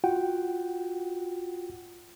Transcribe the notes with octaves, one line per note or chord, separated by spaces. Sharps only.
F4 F#4 F#5 G5